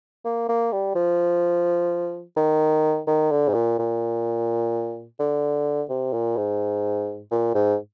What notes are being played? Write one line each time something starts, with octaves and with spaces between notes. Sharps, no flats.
A#3
A#3
G3
F3
D#3
D#3
D3
G#2
A#2
A#2
D3
C3
A#2
G#2
A#2
G#2